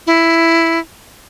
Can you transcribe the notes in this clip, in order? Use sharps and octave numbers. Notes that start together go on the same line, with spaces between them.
E4